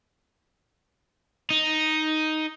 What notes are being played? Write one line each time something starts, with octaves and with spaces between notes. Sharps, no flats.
D#4